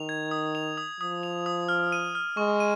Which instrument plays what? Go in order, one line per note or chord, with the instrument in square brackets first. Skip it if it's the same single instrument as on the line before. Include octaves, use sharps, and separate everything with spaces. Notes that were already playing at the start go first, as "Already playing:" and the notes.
Already playing: [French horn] D#3 [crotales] F7
[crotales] G#6
D#6
F7
D#6
[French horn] F3 [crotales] D#6
[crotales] F7
D#6
F6
D#7
F6
[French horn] G#3 [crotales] C#6
[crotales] D#7